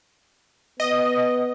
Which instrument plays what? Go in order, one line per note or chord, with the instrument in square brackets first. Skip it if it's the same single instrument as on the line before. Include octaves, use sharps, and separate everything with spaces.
[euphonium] B3 [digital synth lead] D#5